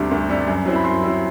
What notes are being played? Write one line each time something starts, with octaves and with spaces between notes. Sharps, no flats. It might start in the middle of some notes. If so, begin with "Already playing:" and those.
Already playing: D2 C3 G3 D4
D2
C3 G3 D4
F#2
F#3 C4 E4
B5
F#2 C6
F#3 C4 E4